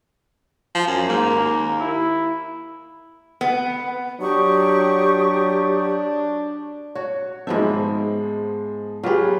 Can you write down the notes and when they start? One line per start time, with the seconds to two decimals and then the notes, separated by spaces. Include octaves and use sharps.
0.75 F3
0.87 F#2
1.09 G#2 A#3
1.30 D#2
1.80 E4
3.41 B3
4.20 F#3 D4 G4 C#6 D#6
6.95 F#4 C#5
7.47 G#2 F3 G#3 B3 E5
9.03 F#3 F4 G4 G#4 B4